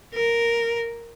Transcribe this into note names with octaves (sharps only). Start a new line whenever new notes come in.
A#4